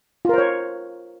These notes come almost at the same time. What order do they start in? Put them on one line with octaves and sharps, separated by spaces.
F4 A#4 C5 C#5